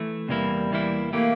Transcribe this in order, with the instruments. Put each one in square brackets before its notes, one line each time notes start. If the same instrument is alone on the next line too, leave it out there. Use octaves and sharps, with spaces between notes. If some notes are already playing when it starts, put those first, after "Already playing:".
Already playing: [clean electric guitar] E3 A3
[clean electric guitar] E2 C3 E3 A#3 E4 [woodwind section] G3
[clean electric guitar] E2 C3 E3 A#3 E4
[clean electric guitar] E3 A3 E4 G4 [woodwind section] A#3